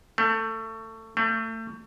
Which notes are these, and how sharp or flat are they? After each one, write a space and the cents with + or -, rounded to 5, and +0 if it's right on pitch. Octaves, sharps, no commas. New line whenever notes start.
A3 +25
A3 +35